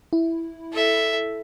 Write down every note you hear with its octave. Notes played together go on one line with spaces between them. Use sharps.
E4
A4 E5